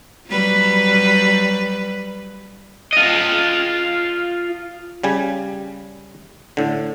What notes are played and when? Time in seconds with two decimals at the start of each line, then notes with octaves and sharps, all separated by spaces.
0.27 F#3 G3 B4
2.93 F4 D#5
5.03 C#3 G3 G#5
6.57 A2 D3